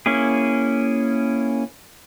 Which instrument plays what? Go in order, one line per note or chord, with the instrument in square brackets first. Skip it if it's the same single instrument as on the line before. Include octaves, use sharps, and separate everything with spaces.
[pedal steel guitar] A#3 C#4 E4 G#4